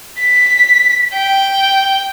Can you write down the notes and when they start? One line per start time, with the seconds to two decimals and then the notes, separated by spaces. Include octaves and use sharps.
0.20 B6
1.14 G5